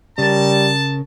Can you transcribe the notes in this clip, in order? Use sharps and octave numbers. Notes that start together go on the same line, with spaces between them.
C#3 G3 A#4 A5